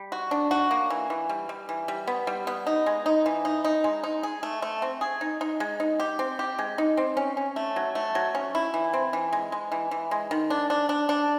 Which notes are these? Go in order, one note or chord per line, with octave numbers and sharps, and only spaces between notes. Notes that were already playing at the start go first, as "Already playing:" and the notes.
Already playing: G3
F#4
D4
F#4
A#3
E3
E3
G3
G3
E3
G3
B3
G3
B3
D#4
G#3
D#4
E3
D#4
D#4
G#3
D#4
G#4
A3
A3
C4
G#4
D#4
D#4
G#3
D#4
G4
C4
G4
G#3
D#4
C4
C#4
C#4
A3
F#3
A3
F#3
C#4
E4
E3
C4
E3
G#3
G#3
E3
E3
G#3
D#3
D4
D4
D4
D4